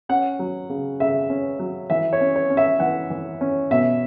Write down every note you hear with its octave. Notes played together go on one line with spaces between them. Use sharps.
C#4 F#5
F#3
C#3
C#3 E5
C#4
F#3
E3 E5
C#5
C#4
C#5
C#4
E5
E3 F#5
E3
C#4
B2 E5